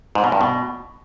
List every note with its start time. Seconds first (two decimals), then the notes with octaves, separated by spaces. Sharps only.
0.15 G#2
0.24 B2
0.32 G2
0.41 B2